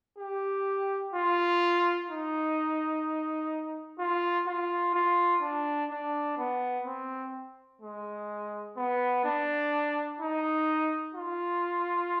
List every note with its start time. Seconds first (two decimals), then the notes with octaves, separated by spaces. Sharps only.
0.18 G4
1.14 F4
2.09 D#4
3.99 F4
4.47 F4
4.94 F4
5.42 D4
5.91 D4
6.38 B3
6.86 C4
7.82 G#3
8.77 B3
9.25 D4
10.20 D#4
11.15 F4